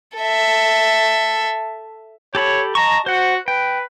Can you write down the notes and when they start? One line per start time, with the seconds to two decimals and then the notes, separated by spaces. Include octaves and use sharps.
0.18 A4 E5
2.35 G4 A4 C#5 B5
2.75 D#5 A5 A#5 C#6
3.06 F#4 C5 F#5
3.48 B4 G5